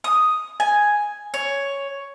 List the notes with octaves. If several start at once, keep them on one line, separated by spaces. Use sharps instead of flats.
D#6
G#5
C#5